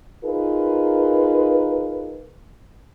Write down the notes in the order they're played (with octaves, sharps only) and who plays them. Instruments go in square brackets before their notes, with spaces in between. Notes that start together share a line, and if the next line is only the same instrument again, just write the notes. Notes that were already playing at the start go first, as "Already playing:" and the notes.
[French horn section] D#4 F4 G#4 A#4 B4